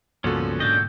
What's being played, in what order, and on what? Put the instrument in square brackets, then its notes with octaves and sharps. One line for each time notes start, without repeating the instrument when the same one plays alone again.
[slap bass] C#2 G2 [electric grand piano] A#2 F#4 A4 [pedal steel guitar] F3 B3 C#4
[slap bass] G#2 B2 D3 [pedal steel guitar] C#4 D4 D#5 [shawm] G5